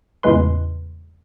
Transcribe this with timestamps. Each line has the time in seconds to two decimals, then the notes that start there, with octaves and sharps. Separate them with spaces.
0.23 E2 A2 C#3 G#3 B4 C6